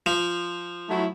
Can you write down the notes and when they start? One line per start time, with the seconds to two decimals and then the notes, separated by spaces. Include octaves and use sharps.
0.06 F3
0.90 F#3 A3 E4